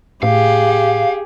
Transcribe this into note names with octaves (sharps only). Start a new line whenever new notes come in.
A2 G4 G#4 F5